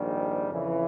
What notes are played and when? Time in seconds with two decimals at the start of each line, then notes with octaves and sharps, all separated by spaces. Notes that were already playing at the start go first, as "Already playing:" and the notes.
Already playing: A#1 G#2 D#3 G3
0.50 F2 C#3 E3